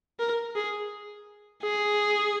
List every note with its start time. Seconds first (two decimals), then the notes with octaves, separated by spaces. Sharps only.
0.20 A#4
0.56 G#4
1.63 G#4